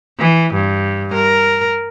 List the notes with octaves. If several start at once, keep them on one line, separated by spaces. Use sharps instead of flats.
E3
G2
A#4